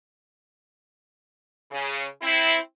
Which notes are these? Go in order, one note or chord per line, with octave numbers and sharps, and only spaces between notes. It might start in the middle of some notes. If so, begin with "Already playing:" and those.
C#3
C4 E4